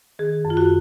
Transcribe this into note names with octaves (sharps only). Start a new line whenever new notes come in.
D#3 G#4
F#2
F4
F#4